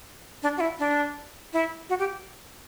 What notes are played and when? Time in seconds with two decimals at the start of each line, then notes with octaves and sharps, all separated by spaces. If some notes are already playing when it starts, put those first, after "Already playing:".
0.43 D4
0.57 F#4
0.60 E4
0.79 D4
1.53 E4
1.89 F#4
1.99 G4